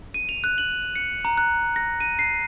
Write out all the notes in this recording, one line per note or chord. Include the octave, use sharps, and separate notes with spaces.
D#7
F7
F#6
F#7
C#7
A#5
F#6
A#6
D#7
C7